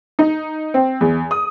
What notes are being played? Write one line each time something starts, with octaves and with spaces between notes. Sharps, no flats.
D#4
C4
E2
D#6